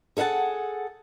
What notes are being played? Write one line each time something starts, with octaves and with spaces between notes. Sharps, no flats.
G#4 A4 E5 F#5 A5